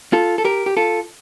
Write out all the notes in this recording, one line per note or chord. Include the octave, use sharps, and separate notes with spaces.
F4 A4
A4
G4 A#4
G4
F4 A4